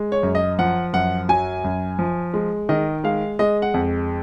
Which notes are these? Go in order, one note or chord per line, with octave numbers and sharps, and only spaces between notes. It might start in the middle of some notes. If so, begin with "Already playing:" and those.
Already playing: G#3
C#5
F#2
D#5
F3 F#5
F#2 F#5
F#3 G#5
F#2
F3
G#3
D#3 D#5
G#3 F5
G#3 D#5
F#5
F2